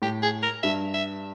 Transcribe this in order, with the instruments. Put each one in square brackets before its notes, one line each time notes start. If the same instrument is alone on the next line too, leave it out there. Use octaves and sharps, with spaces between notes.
[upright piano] A2 [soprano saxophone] G4
[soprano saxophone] G#4
A#4
[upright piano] G2 [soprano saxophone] E5
[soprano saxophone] E5